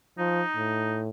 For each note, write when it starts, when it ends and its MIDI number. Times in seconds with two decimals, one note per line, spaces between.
0.18 0.42 53
0.18 1.00 63
0.56 1.09 45